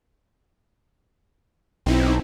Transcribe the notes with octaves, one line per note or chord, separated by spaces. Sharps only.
B1 C4 D#4 E4